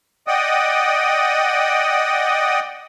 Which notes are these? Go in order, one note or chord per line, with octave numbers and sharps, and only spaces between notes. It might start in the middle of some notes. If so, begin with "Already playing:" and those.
D5 D#5 F#5 G5 D#6